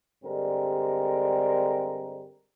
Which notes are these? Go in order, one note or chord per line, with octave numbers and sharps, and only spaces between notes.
G2 D3 G3 G#3 C4 A#4